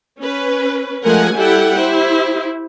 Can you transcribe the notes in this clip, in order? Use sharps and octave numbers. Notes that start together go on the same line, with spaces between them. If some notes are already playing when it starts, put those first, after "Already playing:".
C#4 B4
F3 G#3 A3 A#4 F#5 G#5
G3 E4 G4 A4 F#5 G5
E4 G4 C5